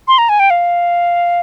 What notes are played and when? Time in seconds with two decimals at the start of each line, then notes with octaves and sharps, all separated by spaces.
0.08 C6
0.18 A#5
0.29 G#5
0.40 G5
0.50 F5